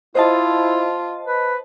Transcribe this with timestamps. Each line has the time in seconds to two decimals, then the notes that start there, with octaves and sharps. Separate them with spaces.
0.15 E4 F4 C5 D#5 A5
1.27 B4